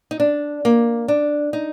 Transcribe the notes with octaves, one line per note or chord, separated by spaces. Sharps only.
D#4
D4
A#3
D4
D#4